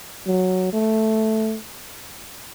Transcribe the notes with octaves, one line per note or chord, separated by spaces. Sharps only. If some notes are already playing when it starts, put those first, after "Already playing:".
F#3
A3